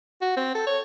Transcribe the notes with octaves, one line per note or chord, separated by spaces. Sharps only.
F#4
C4
A4
C#5